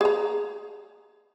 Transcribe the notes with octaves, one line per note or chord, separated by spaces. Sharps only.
G#4 A#5